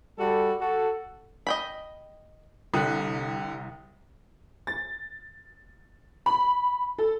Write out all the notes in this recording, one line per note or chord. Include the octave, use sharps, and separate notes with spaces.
G3 F#4 A4
F#4 A4
D#5 G5 B5
C2 D3 G5 D#6 F#6
A6
B5
A4